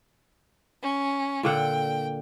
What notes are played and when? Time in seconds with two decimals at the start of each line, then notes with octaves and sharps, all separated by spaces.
0.83 C#4
1.43 A#2 D3 F#5 G5